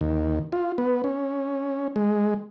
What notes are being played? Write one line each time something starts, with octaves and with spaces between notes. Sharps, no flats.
D#2
F4
B3
C#4
G#3